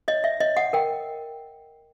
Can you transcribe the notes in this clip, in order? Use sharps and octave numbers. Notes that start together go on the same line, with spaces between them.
C#5 D#5
E5
C#5 D#5
F#5
A#4 G5